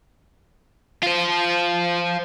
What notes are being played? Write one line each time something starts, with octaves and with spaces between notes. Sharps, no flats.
F4 C5